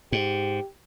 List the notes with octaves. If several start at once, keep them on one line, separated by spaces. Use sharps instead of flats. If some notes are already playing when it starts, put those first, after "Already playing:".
G#2 G4